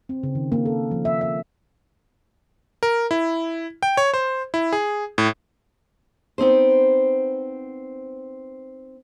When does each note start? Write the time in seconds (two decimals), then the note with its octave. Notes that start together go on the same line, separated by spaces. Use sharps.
0.09 C4
0.23 C#3
0.35 D#3
0.52 A#3
0.65 A4
0.91 F3
1.05 E5
1.21 E5
2.83 A#4
3.11 E4
3.83 G5
3.97 C#5
4.14 C5
4.54 E4
4.73 G#4
5.18 A2
6.38 B3 C4 D#4 C5